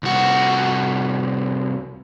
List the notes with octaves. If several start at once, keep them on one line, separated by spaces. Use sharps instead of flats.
C2 F#4